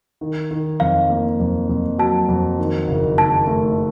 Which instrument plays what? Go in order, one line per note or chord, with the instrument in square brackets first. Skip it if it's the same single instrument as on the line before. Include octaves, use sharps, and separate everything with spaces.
[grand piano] D#3
D#3
[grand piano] F2 [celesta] F5
[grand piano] A#3
F2
F2
[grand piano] F#3 [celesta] A5
[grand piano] F2
D#3
F#1
[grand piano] D#3 [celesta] A5
[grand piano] A3